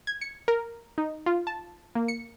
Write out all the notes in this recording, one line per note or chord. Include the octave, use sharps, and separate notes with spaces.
G#6
C#7
A#4
D#4
F4
A5
A#3
C#7